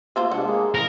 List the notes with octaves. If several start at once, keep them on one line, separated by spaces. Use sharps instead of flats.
A3 F4 C5
C3 G#3 D4 F#5
G#3 A#3 G#4
E4 A#4